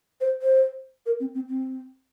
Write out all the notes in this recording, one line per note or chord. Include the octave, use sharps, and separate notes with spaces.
C5
C5
A#4
C4
C4
C4